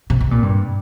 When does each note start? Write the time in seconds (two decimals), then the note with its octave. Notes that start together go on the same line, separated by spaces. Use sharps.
0.10 C3
0.21 C3
0.31 A#2
0.42 G2